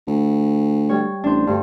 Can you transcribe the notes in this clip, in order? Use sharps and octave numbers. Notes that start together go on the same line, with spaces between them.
D2
G3 C#5
A1 D4 C5
D2 G2